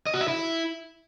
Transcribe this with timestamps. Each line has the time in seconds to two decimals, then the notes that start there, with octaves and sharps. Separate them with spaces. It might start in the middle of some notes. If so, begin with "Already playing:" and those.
0.06 D#5
0.14 F#4
0.21 E5
0.28 E4